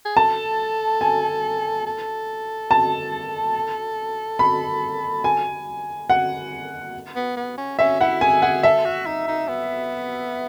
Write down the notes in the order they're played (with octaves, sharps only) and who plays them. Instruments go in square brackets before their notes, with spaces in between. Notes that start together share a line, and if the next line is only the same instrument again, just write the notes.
[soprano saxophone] G#4
[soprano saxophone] A4 [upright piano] A5
[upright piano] G#5
[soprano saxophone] A4
[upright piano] A5
B5
G#5
F#5
[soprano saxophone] B3
B3
C#4
[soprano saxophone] C#4 [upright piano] E5
[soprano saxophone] E4 [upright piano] F#5
[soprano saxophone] G#4 [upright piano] G#5
[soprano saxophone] G#4 [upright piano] F#5
[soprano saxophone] A4 [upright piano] E5
[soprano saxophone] F#4
D#4
D#4
B3